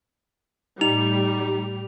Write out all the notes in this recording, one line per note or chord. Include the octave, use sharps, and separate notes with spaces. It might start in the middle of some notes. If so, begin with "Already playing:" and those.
A2 G3 D#4 F7